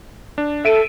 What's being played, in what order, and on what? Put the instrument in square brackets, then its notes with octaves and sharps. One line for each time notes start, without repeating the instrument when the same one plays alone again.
[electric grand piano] D4
[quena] A4 [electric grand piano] E5 D7 D#7